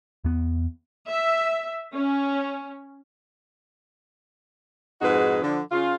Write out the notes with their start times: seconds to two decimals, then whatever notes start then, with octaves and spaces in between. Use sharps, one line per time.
0.24 E2 B3
1.10 E5
1.95 C#4
5.01 F2 G#2 D#4 F#4 G#4 B4
5.42 D3 F3
5.72 C#3 F4